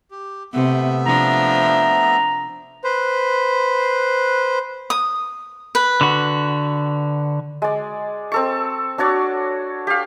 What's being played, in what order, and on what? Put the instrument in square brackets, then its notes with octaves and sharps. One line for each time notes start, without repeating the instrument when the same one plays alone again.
[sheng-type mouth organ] G4
[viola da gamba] C3 [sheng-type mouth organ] A3 B3 E5
[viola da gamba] F3 D4 [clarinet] A#5
[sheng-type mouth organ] B4 C5
[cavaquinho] D#6
B4
[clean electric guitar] D3 F#4
[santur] G#3 D5
C4 A4 C#6
D4 F#4 C#5 D5
G4 F5